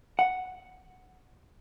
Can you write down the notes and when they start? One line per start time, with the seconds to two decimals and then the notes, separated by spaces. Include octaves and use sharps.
0.19 F#5